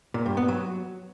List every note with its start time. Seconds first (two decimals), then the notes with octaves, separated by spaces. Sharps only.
0.14 A#2
0.26 G2
0.37 B3
0.48 F#3